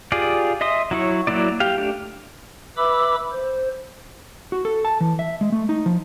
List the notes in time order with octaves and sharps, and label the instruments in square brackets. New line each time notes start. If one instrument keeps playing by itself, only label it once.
[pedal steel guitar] F4 G4 G#4 D5
D#5 E5 C6 D#6
F#3 E4 C#5
F#3 A#3 E4 D5
G4 F5
A3 D4 G4
[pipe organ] B4 E5 B5 D6 E6
C5
[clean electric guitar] F#4
A4
A5
E3
E5
G#3
A3
D#4
F3